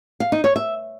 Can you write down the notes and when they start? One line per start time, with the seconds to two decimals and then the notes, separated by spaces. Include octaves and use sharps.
0.20 F5
0.32 D#4
0.44 C#5
0.56 E5